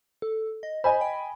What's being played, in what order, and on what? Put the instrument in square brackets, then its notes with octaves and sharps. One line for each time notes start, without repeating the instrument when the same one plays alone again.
[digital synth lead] A4
D#5
[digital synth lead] C5 [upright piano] D#5 G#5 B5
[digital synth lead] G5